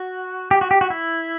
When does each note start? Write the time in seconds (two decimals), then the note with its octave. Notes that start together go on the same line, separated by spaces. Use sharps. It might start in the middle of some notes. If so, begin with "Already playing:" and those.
Already playing: F#4
0.51 G4
0.61 F#4
0.71 G4
0.81 F#4
0.90 E4